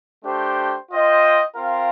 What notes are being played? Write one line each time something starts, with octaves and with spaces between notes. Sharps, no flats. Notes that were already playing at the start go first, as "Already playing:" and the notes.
A3 D4 G4 C5 G5
F4 C5 D#5 G5
C4 F4 A#4 F5